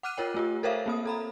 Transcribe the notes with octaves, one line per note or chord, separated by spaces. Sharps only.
F#5 D6 F6 F#6 D#7
F4 A#4 C#5 G5
A3 F4 G4
A4 A#4 C5 C#5 E5 F5
A#3 C4 D#6
A4 A#5 B5